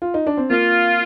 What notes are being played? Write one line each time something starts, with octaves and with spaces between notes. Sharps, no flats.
F4
D#4
D4
C4
A#3 F4